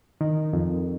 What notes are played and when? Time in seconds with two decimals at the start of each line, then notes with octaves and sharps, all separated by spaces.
0.21 D#3
0.53 F2